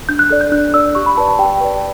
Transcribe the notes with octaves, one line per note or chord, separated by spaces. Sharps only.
D4 G6
F#6
A4 D5 F#6
G6
D4 F#6
A4 D5 E6
G4 C#6
B5
B4 D5 A5
A5
G4 G5
B4 D5 G5